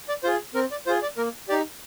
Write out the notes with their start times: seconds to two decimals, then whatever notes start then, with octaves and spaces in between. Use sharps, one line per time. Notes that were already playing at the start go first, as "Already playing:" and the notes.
0.08 D5
0.23 F4 G#4 C5
0.54 C4 A#4
0.71 D5
0.87 F4 G#4 C5
1.02 D5
1.17 A#3 A#4
1.48 G4 D5
1.52 D#4